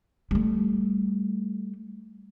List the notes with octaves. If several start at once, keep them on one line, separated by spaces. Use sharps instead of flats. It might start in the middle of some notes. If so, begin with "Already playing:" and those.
G3 A3